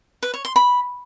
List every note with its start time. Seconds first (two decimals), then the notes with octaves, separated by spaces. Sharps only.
0.23 B4
0.34 C#5
0.45 C6
0.56 B5